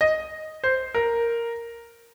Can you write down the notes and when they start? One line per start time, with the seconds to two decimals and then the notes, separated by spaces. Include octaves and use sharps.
0.01 D#5
0.64 C5
0.94 A#4